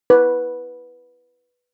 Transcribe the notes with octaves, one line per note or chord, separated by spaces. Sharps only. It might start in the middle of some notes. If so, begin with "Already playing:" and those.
B4